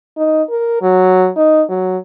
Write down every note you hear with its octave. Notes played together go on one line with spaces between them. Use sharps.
D#4
A#4
F#3
D#4
F#3